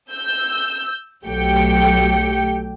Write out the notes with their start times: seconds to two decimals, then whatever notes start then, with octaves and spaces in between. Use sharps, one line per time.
0.12 E6 G6
1.25 B1 F#3 A3 G4 G5 C#7